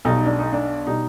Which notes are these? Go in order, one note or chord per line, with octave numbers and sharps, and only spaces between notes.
B1 B2 G3 D#4
D4
D#4
D4
B2 G3 D#4